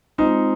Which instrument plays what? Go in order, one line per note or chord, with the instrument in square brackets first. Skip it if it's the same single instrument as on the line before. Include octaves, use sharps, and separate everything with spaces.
[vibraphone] G#3 C4 F4 C5 [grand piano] D#4